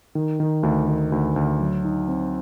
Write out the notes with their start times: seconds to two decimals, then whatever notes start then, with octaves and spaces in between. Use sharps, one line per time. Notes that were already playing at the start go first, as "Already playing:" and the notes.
0.15 D#3
0.40 D#3
0.63 D2
0.88 D#3
1.12 D2
1.36 D2
1.60 F#3
1.85 D#4
2.08 C4